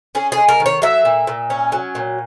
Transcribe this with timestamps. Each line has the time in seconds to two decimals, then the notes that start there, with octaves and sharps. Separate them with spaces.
0.15 C#4 G#4
0.32 G#4
0.37 G#3
0.48 A#4
0.60 D#3
0.66 C#5
0.82 F#3 E5
1.05 A#2
1.27 A#2
1.50 C#4
1.72 F#3
1.95 A#2